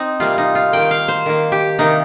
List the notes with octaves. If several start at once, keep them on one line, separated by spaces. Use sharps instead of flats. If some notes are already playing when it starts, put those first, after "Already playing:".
Already playing: C4 D#4
C3 G3 A#3 F4
D#4
F4
D#3 A#3 G5
F5
C5
D#3 A#3
G4
C3 D#3 A#3 D#4